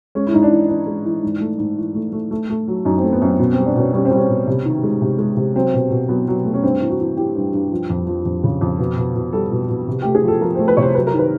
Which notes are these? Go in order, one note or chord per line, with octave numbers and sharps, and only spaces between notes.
G#3 C#4
E4
G#2 D#4
D4
E3
E3 D4
G#3
E3
G#2
A3
G#2
E3
A3
A3
A3
A3
F#3
F#2 D#4
C4
A3
B3
F#2 C4
B2 B3
C4
G3
D4
B2 C#4
G3 C#4
C4
G3
C#4
B2
C3
D#3
G#3
C3
G#3
C3
F#3 C4
B2
B2
F#3 B3
F#3
A3
C#4
G2 C4
E3
F#4
E3
E3 G4
G2
G2
F3
F2
F3
F2
C#3
F2
B2
B2
B2
G3 A4
B2
B2
C3
A3 G4
G#4
F3 A4
F3 A#4
C5
A3
B4
C3 C#5
C5
F#3 B4
A#4
D#3 B4